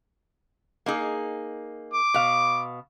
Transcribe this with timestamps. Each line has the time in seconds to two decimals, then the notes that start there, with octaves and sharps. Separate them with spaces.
0.86 A#3 D#4 G#4
1.93 D6
2.14 B2 F5